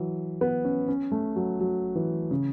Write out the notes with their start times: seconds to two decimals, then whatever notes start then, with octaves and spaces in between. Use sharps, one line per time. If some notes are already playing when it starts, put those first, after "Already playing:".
Already playing: E3 F#3
0.41 B3
0.65 C#4
0.88 C#4
1.12 A3
1.36 F#3
1.60 F#3
1.95 E3
2.31 C#3